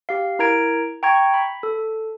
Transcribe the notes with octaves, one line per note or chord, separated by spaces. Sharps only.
G4 F5
E4 A#4 A#5 G#6 D7
G5 A#5 C#6 G#6
B5
A4